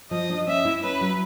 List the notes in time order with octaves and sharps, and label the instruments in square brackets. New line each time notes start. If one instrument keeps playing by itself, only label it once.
[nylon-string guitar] F3 [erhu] D#5
[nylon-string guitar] D4
[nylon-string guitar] C#4 [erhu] E5
[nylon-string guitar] E4
[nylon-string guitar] C#4 [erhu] B4
[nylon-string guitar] F#3